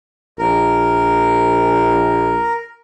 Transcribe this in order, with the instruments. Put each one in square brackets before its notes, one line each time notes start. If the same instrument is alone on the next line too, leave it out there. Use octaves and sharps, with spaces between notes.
[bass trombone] A#1 [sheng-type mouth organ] A#4